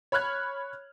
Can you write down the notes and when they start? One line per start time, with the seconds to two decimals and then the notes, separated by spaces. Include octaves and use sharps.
0.12 C#5 B5 F6 F#6 G#6